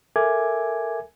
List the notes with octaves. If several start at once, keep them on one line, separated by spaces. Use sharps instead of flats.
A4 A#4 E5 G#5 D6 G#6